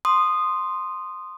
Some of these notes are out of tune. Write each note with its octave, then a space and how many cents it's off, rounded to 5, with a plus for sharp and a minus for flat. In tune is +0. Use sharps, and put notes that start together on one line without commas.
C6 +0 D#6 -15